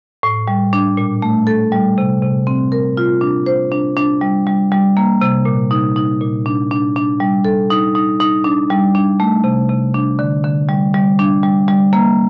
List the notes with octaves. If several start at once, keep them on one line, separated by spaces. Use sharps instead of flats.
A2
G3
D4
A#2
A3
A4
G3
C3
C3
C4
A#4
F4
D4
C5
D4
D4
G3
G3
G3
A#3
C3
A#2
D#4
D#4
A#2
D4
D4
D4
G3
A4
D#4
D#4
D#4
D4
G3
D4
A3
C3
C3
D4
D3
D3
G3
G3
D4
G3
G3
A#3